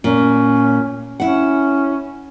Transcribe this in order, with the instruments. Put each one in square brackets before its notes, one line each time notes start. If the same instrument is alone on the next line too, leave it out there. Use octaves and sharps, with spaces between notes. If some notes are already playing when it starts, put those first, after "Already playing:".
[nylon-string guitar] A#2 [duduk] C#4
[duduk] C#4 [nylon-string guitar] E4 F#5